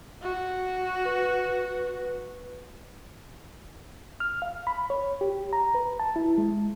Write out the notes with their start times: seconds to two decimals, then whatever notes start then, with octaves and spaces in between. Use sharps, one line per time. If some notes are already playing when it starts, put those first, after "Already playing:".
0.22 F#4
1.05 B4
4.20 F6
4.42 F5
4.67 B5
4.90 C#5
5.21 G4
5.53 A#5
5.75 B4
6.00 A5
6.16 E4
6.38 G#3